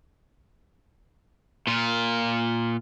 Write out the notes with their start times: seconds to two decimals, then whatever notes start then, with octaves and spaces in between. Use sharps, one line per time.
1.67 A#2 F4